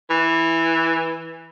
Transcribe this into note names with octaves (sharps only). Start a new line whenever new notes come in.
E3